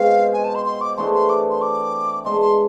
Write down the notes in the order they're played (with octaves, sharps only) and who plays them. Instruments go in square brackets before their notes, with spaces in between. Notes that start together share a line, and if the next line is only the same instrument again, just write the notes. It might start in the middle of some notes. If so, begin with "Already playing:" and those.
Already playing: [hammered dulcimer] B2 G#3 C4 F4 [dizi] F5
[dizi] G#5
A5
C6
C6
D6
[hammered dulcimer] E3 A3 D4 G#4 [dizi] C6
[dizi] C6
D6
C6
D6
[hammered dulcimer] B2 G#3 D4 [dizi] C6
[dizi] C6